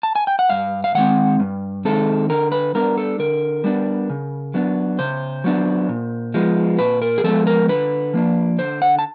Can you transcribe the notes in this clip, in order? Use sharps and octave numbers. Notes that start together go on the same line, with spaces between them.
A5
G#5
G5
F#5
G2 F5
F5
D#3 G#3 C4 F#5
G2
D#3 G#3 C4 A4
D3 A#4
B4
G3 B3 D4 A#4
A4
D3 A#4
G3 B3 D4
C#3
F#3 B3 D4
C#3 C5
F#3 B3 D4
A#2
F3 G#3 B3
A#2 B4
A#4
G#4
F3 G#3 B3 A4
A#4
D3 B4
F3 A#3 D4
D3 C5
F#5
A5